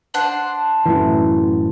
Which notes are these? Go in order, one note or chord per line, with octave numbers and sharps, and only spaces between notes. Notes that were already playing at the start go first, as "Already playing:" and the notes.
D4 C5 F#5
F#2 A2 E3